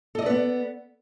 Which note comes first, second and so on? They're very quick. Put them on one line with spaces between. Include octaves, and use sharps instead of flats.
A4 D#5 D5 B4 B3